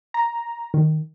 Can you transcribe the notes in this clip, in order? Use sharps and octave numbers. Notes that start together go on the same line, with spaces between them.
A#5
D#3